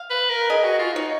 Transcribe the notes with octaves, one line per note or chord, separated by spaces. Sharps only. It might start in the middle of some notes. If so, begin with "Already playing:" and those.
Already playing: F5
B4
A#4
G#4 D#5
F#4
F4
D#4 C#5